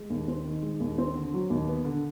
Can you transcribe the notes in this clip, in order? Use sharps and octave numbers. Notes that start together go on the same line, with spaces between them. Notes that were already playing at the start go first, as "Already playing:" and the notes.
Already playing: G#3
D#2
C4
D#3
G#3
D#2
C4
D3
F#3
D#2
B3
D3